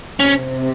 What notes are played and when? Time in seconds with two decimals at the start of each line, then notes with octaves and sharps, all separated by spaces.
0.20 C3 C#4